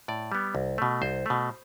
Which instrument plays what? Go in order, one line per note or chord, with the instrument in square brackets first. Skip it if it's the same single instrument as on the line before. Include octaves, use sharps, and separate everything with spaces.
[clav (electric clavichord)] A2 D5
G3 B3
C2
B2 A3
C2 C5
B2 A3